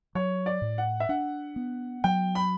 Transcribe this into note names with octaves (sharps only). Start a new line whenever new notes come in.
F#3 C#5
D5
A2
F#5
E5
D4 F#5
B3
F#3 G5
B5